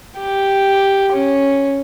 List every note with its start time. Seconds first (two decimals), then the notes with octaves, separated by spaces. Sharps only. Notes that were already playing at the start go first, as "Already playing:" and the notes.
0.18 G4
1.12 C#4